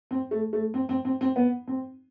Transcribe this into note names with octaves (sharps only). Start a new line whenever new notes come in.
C4
A3
A3
C4
C4
C4
C4
B3
C4